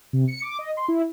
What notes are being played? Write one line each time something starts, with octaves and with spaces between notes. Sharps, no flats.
C3
C#7
D6
D#5
C6
E4